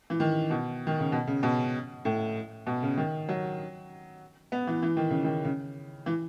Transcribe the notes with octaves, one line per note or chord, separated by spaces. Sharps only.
E3
D#3
B2
D#3
C#3
B2
C#3
B2
A2
B2
C#3
D#3
F#3
B3
E3
E3
D#3
C#3
D#3
C#3
E3